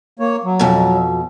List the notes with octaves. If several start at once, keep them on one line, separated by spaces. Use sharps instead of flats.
A#3 C#5
F#3
F2 B2